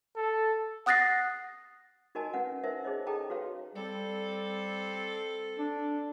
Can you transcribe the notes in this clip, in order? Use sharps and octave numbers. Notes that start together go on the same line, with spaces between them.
A4
F#5 D#6 F#6 A6 A#6 C7
D#4 F#4 A#4 D#5 G#5 A5
C#4 B4 F#5
D#4 A#4 C5 E5
D#4 G#4 C5 C#5 D#5
G#4 A4 D#5 G5 A5 A#5
F#4 B4 C#5 F5
G3 C4 A4
D4